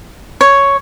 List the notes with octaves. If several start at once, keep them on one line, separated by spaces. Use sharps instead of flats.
C#5